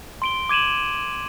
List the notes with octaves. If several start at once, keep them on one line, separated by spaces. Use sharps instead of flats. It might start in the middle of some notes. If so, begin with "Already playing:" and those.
C6 D7 G7
D6 G#6 D#7 E7 F#7